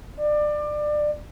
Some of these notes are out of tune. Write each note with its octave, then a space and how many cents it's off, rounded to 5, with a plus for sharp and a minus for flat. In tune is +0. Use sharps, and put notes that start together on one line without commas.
D5 +25